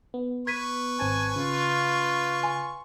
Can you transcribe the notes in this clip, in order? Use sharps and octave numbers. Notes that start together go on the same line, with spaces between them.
B3
B4 C#6 G#6 B6 D#7
G#1 C4 G#5 A5
C#3 F4
G#5 C6